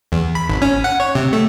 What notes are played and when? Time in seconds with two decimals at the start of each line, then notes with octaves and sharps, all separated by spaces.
0.12 E2
0.35 B5
0.49 G#1
0.62 C#4
0.84 F#5
1.00 C#5
1.15 C3
1.33 A3